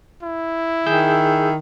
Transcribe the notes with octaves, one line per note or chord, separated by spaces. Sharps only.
E4
D#3 G#4 E6 G6